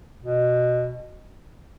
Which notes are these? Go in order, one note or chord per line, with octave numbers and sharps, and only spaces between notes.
B2